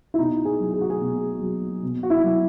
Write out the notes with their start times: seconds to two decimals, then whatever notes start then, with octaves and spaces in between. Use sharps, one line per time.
0.14 E4
0.18 B2 D#4
0.45 G#4
0.60 F#3
0.74 G#4
0.81 F#4
0.90 G#4
1.01 B2
1.41 F#3
1.83 B2
2.03 F#4
2.10 E4
2.24 F#3